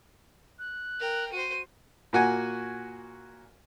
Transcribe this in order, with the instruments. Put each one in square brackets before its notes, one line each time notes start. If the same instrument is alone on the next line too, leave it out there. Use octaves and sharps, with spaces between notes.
[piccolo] F#6
[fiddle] A#4 G5
[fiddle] F#4 C5 [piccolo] D#7
[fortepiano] A#2 A#3 F#4 F#5 G#5